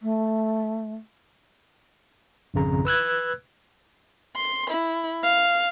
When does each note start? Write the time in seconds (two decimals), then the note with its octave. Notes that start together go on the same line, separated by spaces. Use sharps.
0.02 A3
2.54 G#1 F2 C#3 A#5
2.85 B4 E6 F#6 G#6
4.36 C6
4.70 E4
5.24 F5